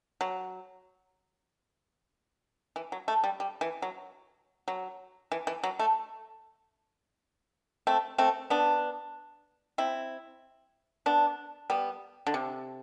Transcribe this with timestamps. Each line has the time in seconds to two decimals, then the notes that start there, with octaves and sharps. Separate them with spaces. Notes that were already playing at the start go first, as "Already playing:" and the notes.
0.21 F#3
2.76 E3
2.92 F#3
3.08 A3
3.24 G3
3.40 G3
3.61 E3
3.82 F#3
4.68 F#3
5.32 E3
5.47 E3
5.63 F#3
5.79 A3
7.87 A3 C4
8.18 A3 C4
8.50 B3 D4
9.78 C4 E4
11.06 B3 D4
11.70 G3 B3
12.27 D3
12.34 C3